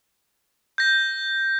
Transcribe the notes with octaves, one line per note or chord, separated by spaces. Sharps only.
G6 A#6